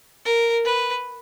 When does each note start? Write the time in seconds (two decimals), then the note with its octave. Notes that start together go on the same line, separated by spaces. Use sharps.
0.25 A#4
0.65 B4